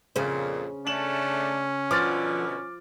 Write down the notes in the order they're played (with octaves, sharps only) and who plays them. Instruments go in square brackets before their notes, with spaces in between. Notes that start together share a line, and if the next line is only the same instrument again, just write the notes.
[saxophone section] F2 A#2 [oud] C#3 C5
[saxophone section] A3 D4 [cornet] C#4 [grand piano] E7 F#7
[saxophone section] B2 D3 [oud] F3 [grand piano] D6 F6 A6